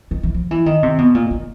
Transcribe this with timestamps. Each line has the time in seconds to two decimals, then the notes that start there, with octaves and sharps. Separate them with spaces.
0.11 D#3
0.23 E3
0.34 F3
0.51 E3
0.66 D#3
0.83 C3
0.98 B2
1.14 A#2
1.31 D#3